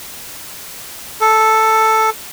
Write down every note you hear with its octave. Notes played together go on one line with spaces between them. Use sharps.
A4